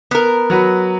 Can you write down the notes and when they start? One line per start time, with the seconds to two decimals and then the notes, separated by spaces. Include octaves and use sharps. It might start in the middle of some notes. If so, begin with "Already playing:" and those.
0.11 B3 A#4
0.50 F#3 F#4 B4